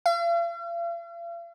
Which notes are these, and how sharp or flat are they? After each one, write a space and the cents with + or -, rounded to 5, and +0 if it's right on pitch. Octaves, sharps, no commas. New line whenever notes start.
F5 -45